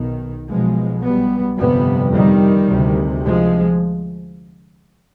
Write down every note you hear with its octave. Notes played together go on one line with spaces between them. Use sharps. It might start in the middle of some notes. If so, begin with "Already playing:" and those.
Already playing: B1 B2 D#3
B1 B2 F3 G#3
G3 B3
G1 F2 C3 G3 B3
D#3 G3
D2 C3
F3 G#3